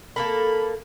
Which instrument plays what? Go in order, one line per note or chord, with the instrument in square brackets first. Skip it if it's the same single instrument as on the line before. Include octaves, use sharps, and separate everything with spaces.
[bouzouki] A#3 A4 A#4 [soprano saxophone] B5